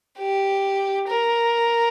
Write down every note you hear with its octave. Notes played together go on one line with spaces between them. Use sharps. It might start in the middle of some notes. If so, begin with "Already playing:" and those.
G4
A#4